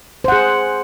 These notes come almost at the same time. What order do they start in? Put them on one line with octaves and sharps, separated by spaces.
C5 F#5 G#4